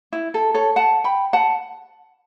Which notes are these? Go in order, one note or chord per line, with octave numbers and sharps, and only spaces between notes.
E4
A4
A4 C#5
F#5 A5
G5 B5
F#5 A5